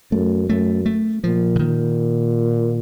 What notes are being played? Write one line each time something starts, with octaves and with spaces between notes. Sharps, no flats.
F#2 A3
F#2 A3
A3
A#2 F3
C#3
A#2 D#3